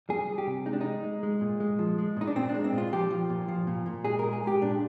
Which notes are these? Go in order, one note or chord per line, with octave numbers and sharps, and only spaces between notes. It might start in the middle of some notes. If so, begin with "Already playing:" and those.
G3 G#4
G3
G4
C3
G#3 D#4
D4
G#3 D#4
G#3
G#3
A#2
G#3
F3
G#3
A#2 D#4
D4
A#2 C4
D4
G#3
C4
A#2
F4
F3 G4
F3
A#2
F3
A#2
A#2
G#3 G#4
A#2 A#4
G#4
G#3 G4
A#2 D4